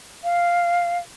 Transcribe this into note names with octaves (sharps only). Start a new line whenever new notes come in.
F5